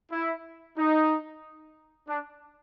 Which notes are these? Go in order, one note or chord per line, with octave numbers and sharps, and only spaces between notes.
E4
D#4
D4